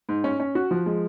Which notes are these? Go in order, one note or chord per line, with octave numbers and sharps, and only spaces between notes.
G#2
C#4
C#4
F#4
F3
G#3